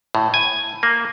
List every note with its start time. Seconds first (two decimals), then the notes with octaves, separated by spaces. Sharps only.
0.15 A2
0.34 G#5
0.83 A#3